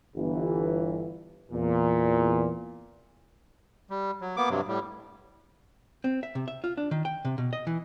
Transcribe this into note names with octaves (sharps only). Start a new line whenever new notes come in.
G1 E3
E2 A#2
G3
F#3
A#3 B3 D6
G2 C3 F#3
A2 G3
C4
E5
C3
E5
F4
D4
D#3
G5
C3
B2
D#5
E3